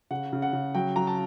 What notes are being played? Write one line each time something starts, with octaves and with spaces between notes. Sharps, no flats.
C#3 F#5
C#3
F#5
C#3
F#3 G5
F#3 A#5
A5